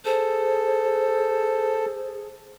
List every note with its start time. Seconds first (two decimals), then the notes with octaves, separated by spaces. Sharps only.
0.05 G#4 A4 C5